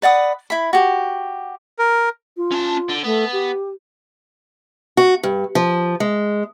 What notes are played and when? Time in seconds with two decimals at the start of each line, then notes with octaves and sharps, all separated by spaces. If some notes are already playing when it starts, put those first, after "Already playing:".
0.02 B4 D5 F#5 D#6
0.50 E4 B5
0.73 F#4 G4
1.79 A#4
2.37 F4
2.51 C#4 A5
2.90 D3
3.04 A3 B3
3.32 G4
4.97 F#4
5.23 G2
5.55 F3
6.00 G#3